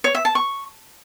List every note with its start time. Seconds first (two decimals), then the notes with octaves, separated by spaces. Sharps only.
0.04 C#5
0.15 E5
0.25 A5
0.35 C#6